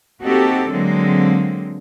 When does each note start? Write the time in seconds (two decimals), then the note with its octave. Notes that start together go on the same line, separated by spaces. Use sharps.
0.22 A#3 C4 D#4 F#4 G4 A4
0.68 D3 F#3 G#3 A#3 C4